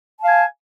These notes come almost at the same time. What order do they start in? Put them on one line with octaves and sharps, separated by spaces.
A5 F5 G#5